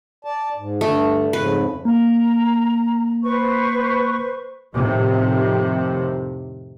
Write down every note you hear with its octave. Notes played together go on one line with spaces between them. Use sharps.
D5 A5
G#2
G2 D3 A3
F2 G#2 C#3 B4
A#3 A#5
B4 C5 C#6
F2 A2 C3 D#3